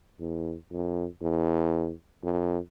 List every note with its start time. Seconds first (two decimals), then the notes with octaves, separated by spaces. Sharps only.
0.20 E2
0.71 F2
1.22 E2
2.23 F2